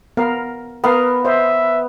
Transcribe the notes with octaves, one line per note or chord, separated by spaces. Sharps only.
B3 A#4 F5
B3 A#4 F5
C5 D#5 E5